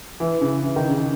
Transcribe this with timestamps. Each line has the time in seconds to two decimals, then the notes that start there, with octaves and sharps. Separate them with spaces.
0.20 E3
0.41 C#3
0.63 E3
0.76 D#3
0.89 C#3